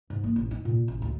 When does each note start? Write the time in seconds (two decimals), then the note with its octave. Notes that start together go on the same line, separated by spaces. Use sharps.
0.10 G#2
0.24 A#3
0.36 A1
0.51 D#4
0.65 A#2
0.88 A1
1.02 D2